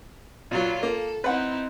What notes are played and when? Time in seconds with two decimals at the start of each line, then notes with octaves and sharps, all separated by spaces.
0.51 A#2 F#3 F4 B4
0.83 A#3 A4
1.24 C4 D#4 E4 B4 F#5